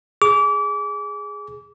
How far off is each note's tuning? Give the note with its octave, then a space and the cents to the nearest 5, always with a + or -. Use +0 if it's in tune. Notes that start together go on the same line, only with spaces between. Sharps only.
G#4 +0 D6 -30